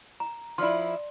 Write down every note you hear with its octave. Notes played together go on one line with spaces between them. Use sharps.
A#5
F3 E4 D5 C6